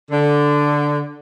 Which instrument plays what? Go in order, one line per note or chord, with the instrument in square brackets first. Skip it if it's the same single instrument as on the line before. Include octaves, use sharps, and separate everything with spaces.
[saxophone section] D3